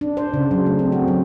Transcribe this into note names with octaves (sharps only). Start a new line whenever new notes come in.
D4
C5
C#3
F#3
A3
C4
F#4
F#3